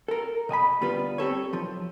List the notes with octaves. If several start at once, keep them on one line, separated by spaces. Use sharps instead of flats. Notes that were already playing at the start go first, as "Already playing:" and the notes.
A4 A#4
B2 D#5 G#5 B5
D3 G3 B3 F4 B4
C4 G4 A4 C#5
B1 F3